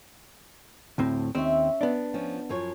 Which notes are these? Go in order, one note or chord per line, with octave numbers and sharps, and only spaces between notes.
D2 A2 C4
D#2 C4 C#4 E5
B3 D4
F3 C#4
F#2 F3 C#5